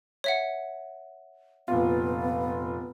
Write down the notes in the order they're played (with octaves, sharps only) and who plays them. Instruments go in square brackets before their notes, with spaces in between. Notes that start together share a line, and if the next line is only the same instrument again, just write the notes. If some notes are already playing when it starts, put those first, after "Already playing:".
[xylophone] C#5 E5 F#5
[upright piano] F1 A#2 F4 [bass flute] B3